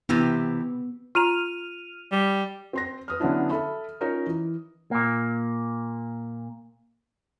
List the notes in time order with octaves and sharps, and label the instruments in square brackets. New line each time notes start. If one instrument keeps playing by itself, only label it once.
[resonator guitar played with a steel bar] C3 E3 G4 [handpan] B3
[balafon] F4 A#5 [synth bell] F6 D#7 F7
[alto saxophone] G3
[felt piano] C4 C6 A#6
B4 D#6 F6
D3 F#3 B3 C#4 D4 E4
A4 E5 B5
C#4 D#4 F4 A#4 C#5
E3
[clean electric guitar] A#2 A#3